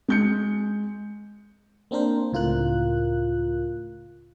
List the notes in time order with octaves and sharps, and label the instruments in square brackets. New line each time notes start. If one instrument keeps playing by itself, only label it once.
[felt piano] G#3 G6 C#7
[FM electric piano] A#3 C4 D4 A#4 C5
C#2 A2 F4 A#4 F#6